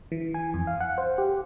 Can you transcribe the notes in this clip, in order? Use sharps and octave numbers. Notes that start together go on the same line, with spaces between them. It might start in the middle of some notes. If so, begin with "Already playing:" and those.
E3
G#5
F2
F5
F#5
C5
G4